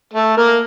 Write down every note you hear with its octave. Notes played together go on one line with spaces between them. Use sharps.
A3 A4
A#3 A#4